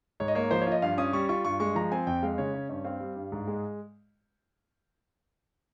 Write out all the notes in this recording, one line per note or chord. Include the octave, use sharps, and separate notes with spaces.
G#2 C#5
D#5
A#3 C#5
F3 C5
C#5
F4 D#5
G2 F5
C#4 D#6
G3 C#6
F4 C#6
G2 C#6
G#3 C#6
F3 A#5
C4 G#5
F2 G5
G#3 F5
C#3 C#5
C#4
G2 C#5
C4 F5
G3
G2
G#2
G#3